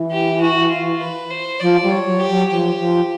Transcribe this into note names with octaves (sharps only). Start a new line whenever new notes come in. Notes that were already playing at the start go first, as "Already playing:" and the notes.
Already playing: E3
G4
F#4
F4
B4
C5
F3 D5
G3
C#5
F#3
G4
F#3
F3 G4
F3